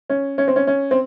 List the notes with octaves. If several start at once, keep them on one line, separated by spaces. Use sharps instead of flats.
C#4
C#4
C4
C#4
C#4
C4